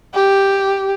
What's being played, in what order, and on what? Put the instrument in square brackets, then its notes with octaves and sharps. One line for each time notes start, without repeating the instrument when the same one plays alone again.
[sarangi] G4